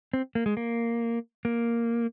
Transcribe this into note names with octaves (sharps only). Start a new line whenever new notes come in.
C4
A#3
G#3
A#3
A#3